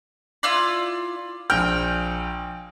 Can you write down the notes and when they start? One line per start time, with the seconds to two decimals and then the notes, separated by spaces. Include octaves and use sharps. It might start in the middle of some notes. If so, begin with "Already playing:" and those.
0.43 E4 F4 D5
1.50 A#1 G5 F6